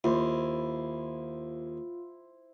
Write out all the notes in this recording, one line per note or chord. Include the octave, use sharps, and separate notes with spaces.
D#2 E4 F4 C5